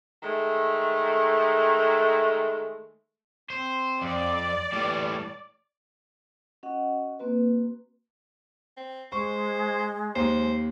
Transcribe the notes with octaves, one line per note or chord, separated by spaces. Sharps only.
D#3 G#3 A3
C4 C5
F2 D5
A2 E3 G3
C#4 F#4 D#5 F#5
A#3 C4 F#4 B4
C4
G#3 C5 C#6
D#2 C5